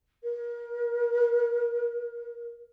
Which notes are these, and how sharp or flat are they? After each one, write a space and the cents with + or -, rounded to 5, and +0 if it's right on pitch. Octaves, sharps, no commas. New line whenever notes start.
A#4 +30